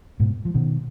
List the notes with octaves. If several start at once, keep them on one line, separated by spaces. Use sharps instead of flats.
G#2 B2
F3
B2 D#3